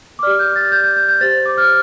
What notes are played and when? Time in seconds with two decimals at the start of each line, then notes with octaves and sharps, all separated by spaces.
0.19 D6
0.23 G4 D5 F6
0.39 G6
0.56 A6
0.72 G6
0.84 G6
0.96 G6
1.08 G6
1.21 G4 C5 A6
1.46 D6
1.57 F6